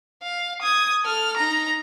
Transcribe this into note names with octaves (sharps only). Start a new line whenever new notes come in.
F5
D#6 G#6
A4 F6
D#4 A#5